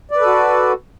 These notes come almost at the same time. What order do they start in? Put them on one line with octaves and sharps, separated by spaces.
D5 B4 A4 F#4